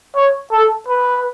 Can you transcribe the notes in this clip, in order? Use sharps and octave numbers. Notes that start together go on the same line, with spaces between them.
C#5
A4
B4